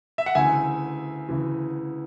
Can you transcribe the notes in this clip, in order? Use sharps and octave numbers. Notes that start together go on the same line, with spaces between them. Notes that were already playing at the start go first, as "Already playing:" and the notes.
E5
F#5
D2 C#3 E3 E5 G#5
D2 C#3 E3